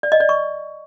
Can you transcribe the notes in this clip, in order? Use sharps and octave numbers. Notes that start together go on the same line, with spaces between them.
D5
D#5
D5
C#6